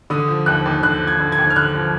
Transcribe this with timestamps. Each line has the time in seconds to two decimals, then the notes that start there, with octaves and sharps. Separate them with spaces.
0.10 D3 D#6
0.28 F3
0.46 D#2 F#6
0.66 D#2
0.83 D3 F#6
1.02 F3
1.07 G#6
1.19 D3
1.32 G#6
1.38 D#2
1.50 F6
1.56 D3 F#6
1.75 F3